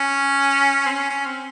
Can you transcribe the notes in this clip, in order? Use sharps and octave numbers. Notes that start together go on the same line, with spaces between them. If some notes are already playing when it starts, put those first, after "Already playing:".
Already playing: C#4
C4
C#4
C#4
C4